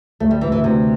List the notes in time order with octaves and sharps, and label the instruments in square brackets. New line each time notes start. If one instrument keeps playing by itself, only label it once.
[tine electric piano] D2 [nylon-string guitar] A3
[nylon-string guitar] G3
[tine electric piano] D2 [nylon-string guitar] E3
[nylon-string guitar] E3
[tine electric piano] D2 [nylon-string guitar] C3